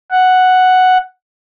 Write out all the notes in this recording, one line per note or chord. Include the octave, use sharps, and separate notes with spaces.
F#5